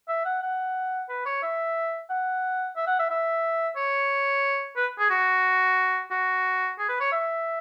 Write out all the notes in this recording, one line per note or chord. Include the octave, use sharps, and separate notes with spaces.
E5
F#5
F#5
B4
C#5
E5
F#5
E5
F#5
E5
E5
C#5
B4
G#4
F#4
F#4
G#4
B4
C#5
E5